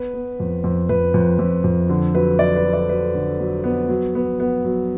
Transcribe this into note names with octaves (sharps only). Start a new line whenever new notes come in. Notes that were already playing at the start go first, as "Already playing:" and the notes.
Already playing: B3 B4
B3
F2
F2
F2 B4
F2
F2
F2
D3
F#3 B4
F#3 D5
B4
F#3
D5
F#3 B4
D3
F#3
B3
F#3
B3
B3
F#3